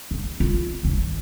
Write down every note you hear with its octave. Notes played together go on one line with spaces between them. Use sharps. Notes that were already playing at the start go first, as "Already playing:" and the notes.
C4
F4
G1 D#2